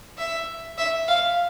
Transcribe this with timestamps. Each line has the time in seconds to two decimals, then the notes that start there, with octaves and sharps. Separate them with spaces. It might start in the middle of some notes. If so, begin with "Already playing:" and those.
0.18 E5
0.78 E5
1.08 F5